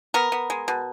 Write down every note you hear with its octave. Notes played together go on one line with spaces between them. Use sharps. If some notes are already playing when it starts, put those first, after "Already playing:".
B3 A#4
B3
G#3
B2